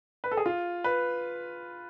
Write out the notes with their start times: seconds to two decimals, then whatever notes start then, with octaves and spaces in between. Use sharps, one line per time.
0.24 B4
0.31 A4
0.37 G#4
0.46 F4
0.84 B4